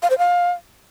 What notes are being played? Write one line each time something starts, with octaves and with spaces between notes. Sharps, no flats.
F5
C5
F5